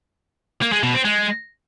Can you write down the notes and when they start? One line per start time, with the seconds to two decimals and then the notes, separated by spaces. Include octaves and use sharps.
0.62 A#3
0.72 G#3
0.83 B2
0.94 C4
1.05 G#3